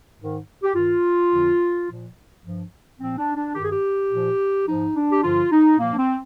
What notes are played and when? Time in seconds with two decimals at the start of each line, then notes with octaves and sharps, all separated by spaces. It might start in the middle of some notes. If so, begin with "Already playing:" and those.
0.19 G#2 D#3
0.63 G4
0.75 G2 D#3 F4
1.31 F2 D3 F3
1.87 A#2 F3
2.43 G2 F3
2.99 A#2 F3 C4
3.18 D4
3.36 D4
3.55 D#3 G4
3.59 G2 G#4
3.72 G4
4.11 A#2 F3
4.67 G#2 F3 D#4
4.95 D4
5.12 G4
5.23 G2 D3 F3 F4
5.52 D#4
5.79 A#2 F3 A#3
5.93 D4
5.98 C4